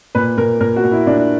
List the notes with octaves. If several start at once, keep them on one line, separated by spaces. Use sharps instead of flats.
A#2 B4
A#2 A#4
A#2 A#4
F#4
A#2
E4
A#2 D4